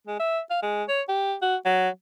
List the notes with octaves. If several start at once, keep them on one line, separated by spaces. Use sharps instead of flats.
G#3
E5
F5
G#3
C#5
G4
F#4
F#3